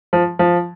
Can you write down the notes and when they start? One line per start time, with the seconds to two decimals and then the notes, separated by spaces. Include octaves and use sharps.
0.13 F3
0.39 F3